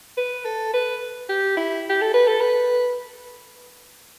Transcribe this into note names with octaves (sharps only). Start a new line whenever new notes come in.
B4
A4
B4
G4
E4
G4
A4
B4
A4
B4